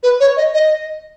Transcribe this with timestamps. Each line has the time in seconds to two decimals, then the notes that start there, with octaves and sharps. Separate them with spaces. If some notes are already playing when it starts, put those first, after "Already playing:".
0.03 B4
0.20 C#5
0.37 D#5
0.54 D#5